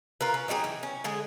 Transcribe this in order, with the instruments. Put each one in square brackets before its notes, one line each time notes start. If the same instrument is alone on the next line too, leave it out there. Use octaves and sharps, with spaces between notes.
[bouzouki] F4 A#4 B4
C#4
F#3 D#4 G4 G#4
E3
C#4
D3 G#3 G#4